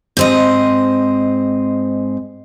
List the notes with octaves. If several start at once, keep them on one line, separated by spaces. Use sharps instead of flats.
G#2 C4 D#5